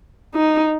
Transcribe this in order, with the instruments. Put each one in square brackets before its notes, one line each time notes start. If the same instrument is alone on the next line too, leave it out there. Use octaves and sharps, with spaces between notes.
[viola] D#4